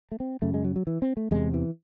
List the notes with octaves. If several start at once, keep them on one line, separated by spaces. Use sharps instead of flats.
A3
C4
F#2 C#3 A3
G#3
F#3
F#3
E3
C4
A3
E2 C3 G#3
E3